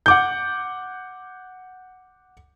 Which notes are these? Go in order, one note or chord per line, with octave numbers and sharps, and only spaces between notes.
F#5 D6 G6